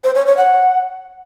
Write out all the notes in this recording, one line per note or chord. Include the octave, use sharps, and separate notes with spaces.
C5
C#5
C#5
F#5